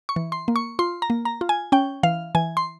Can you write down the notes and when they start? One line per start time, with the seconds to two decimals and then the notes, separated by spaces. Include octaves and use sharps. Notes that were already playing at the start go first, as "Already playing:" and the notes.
0.09 C#6
0.16 E3
0.32 C6
0.48 A#3
0.56 C#6
0.79 F4 C6
1.02 A#5
1.10 A#3
1.25 A#5
1.41 F4
1.49 G#5
1.72 C#4 G5
2.03 E3 F5
2.35 E3 G#5
2.57 C6